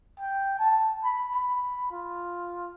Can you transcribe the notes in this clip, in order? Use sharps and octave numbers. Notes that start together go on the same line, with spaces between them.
G5
A5
B5
B5
F4